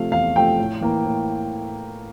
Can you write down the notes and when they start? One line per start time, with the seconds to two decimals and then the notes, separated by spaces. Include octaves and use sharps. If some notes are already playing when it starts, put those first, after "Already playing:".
Already playing: C3 F3 A3 F5
0.12 E2 F5
0.35 C3 F3 A3 G5
0.59 A2
0.81 E3 A#3
1.05 A2